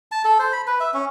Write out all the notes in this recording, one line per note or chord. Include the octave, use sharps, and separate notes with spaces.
A5
A4
C5
B5
B4
E5
C#4